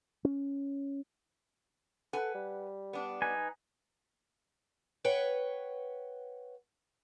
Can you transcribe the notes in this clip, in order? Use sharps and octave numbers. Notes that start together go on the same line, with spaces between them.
C#4
A4 B4 F#5 G#5
G3
B3 D4
D#4 B4 G#5
B4 C#5 F#5 G5